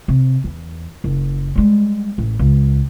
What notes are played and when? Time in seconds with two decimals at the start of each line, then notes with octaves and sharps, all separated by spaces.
0.08 C3
0.44 E2
1.04 F#1
1.56 G3 G#3
2.18 A1
2.39 C#2